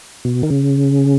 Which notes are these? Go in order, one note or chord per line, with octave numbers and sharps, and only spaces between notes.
B2
D#3
C#3